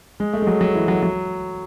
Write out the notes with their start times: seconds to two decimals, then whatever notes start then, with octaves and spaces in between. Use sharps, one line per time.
0.20 G#3
0.33 A3
0.42 G#3
0.47 F#3
0.61 F#3
0.75 E3
0.88 F#3
1.02 F#3